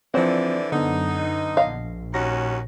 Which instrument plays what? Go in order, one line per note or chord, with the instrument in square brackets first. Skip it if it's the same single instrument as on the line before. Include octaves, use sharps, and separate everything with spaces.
[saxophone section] D3 E3 D5 [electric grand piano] F3 C4 [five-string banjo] C5 F#5
[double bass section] F#2 [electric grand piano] D3 B3 [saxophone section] D#4
[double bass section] A#1 [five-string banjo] D#5 F5
[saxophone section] D#2 C#4 F#4 [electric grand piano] A#6